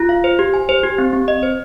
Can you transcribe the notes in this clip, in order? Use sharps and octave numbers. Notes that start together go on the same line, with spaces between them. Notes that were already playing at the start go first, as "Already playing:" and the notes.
Already playing: F4
F5
C5
G4
G#5
C5
G4
C4
C4
D#5
C5